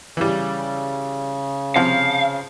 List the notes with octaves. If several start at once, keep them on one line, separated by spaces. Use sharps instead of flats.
C#3 E3 G3
C3 F3 F5